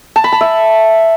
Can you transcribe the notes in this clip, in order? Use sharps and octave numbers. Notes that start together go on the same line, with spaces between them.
A5
B5
A5
E5